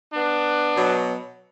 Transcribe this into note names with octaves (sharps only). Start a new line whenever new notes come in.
B3 D4
B2 F#3